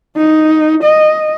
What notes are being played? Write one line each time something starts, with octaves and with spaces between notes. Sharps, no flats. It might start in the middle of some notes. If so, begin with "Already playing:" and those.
D#4
D#5